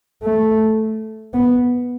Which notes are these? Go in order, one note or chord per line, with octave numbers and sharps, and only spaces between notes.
A3
B3